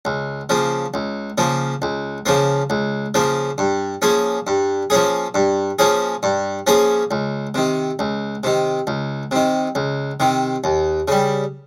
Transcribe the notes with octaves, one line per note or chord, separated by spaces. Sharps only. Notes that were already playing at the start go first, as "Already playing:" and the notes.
C#2
C#3 F3 A#3
C#2
C#3 F3 A#3
C#2
C#3 F3 A#3
C#2
C#3 F3 A#3
G2
F3 A#3 C#4 G#4
G2
F3 A#3 C#4 G#4
G2
F3 A#3 C#4 G#4
G2
F3 A#3 C#4 G#4
C#2
C3 D#3
C#2
C3 D#3
C#2
C3 D#3
C#2
C3 D#3
D#2
C#3 G3